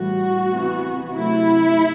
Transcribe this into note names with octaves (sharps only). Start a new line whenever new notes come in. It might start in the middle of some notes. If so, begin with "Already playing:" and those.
Already playing: A2 E3 G3 F#4
C3 E3 B3
C3 F#3 A3 E4